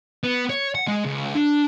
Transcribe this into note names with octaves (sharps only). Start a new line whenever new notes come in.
B3
C#5
F#5
G#3
C#2
D4